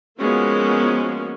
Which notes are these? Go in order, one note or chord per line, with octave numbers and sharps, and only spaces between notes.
F3 G#3 A#3 B3 C#4 F#4